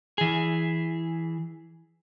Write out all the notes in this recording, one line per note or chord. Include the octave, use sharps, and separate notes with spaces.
E3 G#4